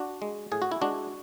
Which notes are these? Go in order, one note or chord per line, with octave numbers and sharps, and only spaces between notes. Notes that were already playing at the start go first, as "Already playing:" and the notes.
Already playing: D4 F#4
G#3
A2 G#4
F#4
E4
G#3 D4 F#4